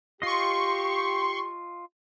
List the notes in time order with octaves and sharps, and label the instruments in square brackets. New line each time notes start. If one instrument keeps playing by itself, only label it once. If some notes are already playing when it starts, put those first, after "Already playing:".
[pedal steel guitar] F4 D#5 [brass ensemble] G4 [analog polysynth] C6 C#6